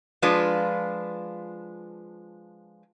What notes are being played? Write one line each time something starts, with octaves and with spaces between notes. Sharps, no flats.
F3 G#3 D4 F4 B4